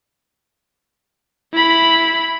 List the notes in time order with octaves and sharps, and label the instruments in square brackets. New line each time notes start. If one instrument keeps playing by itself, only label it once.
[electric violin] E4 B5